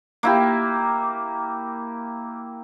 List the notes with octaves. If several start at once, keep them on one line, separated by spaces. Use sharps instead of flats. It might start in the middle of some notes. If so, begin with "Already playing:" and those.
A#3 E4 G4